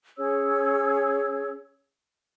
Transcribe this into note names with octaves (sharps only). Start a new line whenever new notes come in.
C#4 G#4 C#5 E6